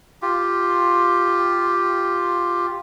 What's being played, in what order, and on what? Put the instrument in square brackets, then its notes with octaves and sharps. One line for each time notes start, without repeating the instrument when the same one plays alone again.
[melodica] F4 G4